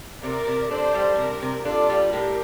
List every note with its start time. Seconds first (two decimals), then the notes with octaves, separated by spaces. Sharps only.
0.23 C3 A#4 D5
0.47 C3
0.71 D4 A4 C5
0.95 G3
1.18 C3 G4 A#4
1.42 C3
1.65 D4 F4 A4
1.89 G3
2.13 A2 G4 A#4